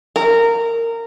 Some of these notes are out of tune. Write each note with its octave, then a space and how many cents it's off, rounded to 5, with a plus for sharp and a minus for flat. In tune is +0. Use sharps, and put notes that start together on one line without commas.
A#4 -20